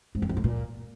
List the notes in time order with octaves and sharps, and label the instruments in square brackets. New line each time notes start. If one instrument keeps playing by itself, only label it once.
[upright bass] G#2
E2
F2
A2
A#2